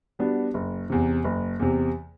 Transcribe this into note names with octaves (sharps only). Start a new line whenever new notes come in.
G3 B3 D4 F#4
F#1
E2 C3
F#1
E2 C3